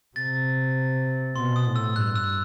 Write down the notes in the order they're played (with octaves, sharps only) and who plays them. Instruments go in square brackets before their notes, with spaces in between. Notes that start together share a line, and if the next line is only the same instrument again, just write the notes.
[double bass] C3 [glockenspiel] A6
[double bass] B2 [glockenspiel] C6
[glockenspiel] D#6
[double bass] A2
[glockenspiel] E6
[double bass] G2 [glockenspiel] F#6
[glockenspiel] E6